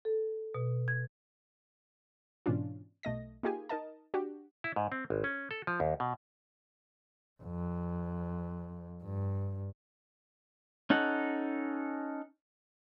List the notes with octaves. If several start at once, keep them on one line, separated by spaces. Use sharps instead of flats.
A4
B2
G#6
G#2 B2 E3 C#4 D4 F4
B1 A3 D#5 A#6
A#3 D#4 F4 G4 G#4 G#5
D#4 A#4 D#5 A5
D4 F#4 G4
E4
G#2
C4
G#1
C#4
A4
F3
D#2
B2
F2
G2
C#4 D#4 A4 F#5